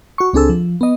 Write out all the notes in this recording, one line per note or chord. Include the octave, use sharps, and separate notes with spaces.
F#4 C#6
C#2 C4 D4 G#4 A4 E6
F3
B3 D#5